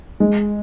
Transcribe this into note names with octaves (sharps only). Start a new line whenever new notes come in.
G#3